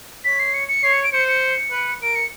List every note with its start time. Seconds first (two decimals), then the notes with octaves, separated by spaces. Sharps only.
0.25 C#5 B6
0.40 C7
0.54 C#7
0.68 C#7
0.83 C#5 C7
0.93 C#7
1.04 D7
1.12 C5 C#7
1.28 C#7
1.71 B4
2.02 A#4 D7
2.15 C#7